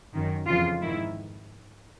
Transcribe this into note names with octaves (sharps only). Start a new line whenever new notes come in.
F#2 D#3
F2 C#3 E3 F4
G#2 D#3 E4